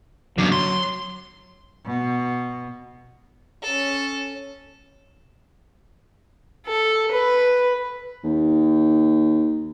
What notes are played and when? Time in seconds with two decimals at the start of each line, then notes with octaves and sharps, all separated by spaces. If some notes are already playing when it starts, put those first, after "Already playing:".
0.38 F#2 D3 F#3
0.52 C6
1.86 B2
3.63 C#4 A4
6.67 A4
7.11 B4
8.24 D#2